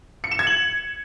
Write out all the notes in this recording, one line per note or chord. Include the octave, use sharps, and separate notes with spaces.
C#7
E7
G#6
F#7